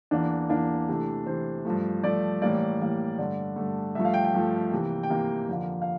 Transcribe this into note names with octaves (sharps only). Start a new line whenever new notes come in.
E2 E3 A#3 D4
E2 E3 A#3 D4
C3 E3 A3
C3 E3 A3 C5
G2 F3 A3
G2 F3 A3 D5
A2 E3 G3 A#3 D5
A2 E3 G3 A#3
G2 D3 A3 D5
G2 D3 A3
G2 F3 A3 E5
F5
G5
G5
G2 F3 A3
C3 E3 A#3
G5
C3 E3 A#3 F5
F2 D3 F3 A#3
F5